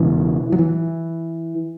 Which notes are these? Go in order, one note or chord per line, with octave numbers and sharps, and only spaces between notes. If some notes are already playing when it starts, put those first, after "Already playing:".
Already playing: E1 E2 C#3 E3
F#3
E3